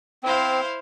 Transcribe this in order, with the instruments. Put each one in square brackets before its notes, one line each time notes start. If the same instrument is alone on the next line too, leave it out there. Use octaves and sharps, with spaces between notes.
[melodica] C4 [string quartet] E4 C5 F5